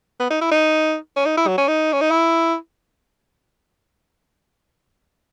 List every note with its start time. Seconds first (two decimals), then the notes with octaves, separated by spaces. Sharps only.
0.20 B3
0.30 D#4
0.41 E4
0.52 D#4
1.16 C#4
1.26 D#4
1.37 E4
1.47 F#3
1.58 C#4
1.68 D#4
1.93 C#4
2.01 D#4
2.11 E4